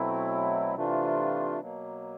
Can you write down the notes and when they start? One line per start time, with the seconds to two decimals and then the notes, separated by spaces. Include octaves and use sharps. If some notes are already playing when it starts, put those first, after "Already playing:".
Already playing: B2 F#3 A3 C4 E4
0.75 C3 E3 A3 D4 F4
1.59 B2 F#3 A#3